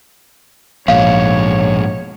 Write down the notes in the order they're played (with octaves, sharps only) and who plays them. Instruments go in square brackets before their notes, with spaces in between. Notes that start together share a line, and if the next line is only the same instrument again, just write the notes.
[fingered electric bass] A#1 [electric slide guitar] G#2 B2 G#3 [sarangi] C#5 [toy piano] F5